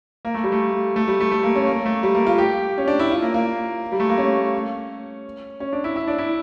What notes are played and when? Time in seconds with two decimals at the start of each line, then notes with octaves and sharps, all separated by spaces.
0.25 A#3
0.34 A3
0.44 G3
0.52 A3
0.96 A3
1.08 G3
1.20 A3
1.31 A3
1.43 A#3
1.55 C#4
1.67 A#3
1.86 A3
2.03 G3
2.14 A#3
2.27 F4
2.38 G4
2.78 C#4
2.88 D4
2.99 E4
3.11 F4
3.22 A#3
3.34 A#3
3.92 G3
4.00 A3
4.09 A#3
4.18 C#4
5.60 C#4
5.73 D4
5.84 E4
5.96 E4
6.08 D4
6.18 E4